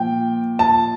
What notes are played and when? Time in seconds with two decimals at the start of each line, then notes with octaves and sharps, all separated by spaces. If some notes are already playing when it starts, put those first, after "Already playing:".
Already playing: A#2 F3 G5
0.59 A5